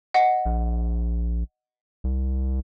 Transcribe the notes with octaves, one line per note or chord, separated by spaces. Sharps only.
D#5 F#5
A#1
C2